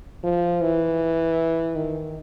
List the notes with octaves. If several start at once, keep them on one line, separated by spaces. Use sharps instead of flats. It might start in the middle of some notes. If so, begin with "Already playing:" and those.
F3
E3
D#3